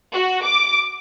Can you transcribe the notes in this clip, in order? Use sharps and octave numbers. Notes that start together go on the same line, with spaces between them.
F#4
D6